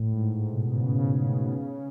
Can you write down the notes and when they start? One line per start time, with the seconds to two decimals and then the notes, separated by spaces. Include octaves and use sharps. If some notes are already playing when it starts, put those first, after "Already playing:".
Already playing: A2
0.13 G#2
0.33 A2
0.53 B2
0.72 C#3
0.99 C#3
1.26 B2
1.52 C#3